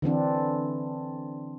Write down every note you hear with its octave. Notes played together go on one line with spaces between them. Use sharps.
D3 E3 C4 D4